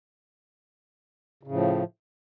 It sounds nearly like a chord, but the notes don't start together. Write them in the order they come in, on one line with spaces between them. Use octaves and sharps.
C#3 A2 F3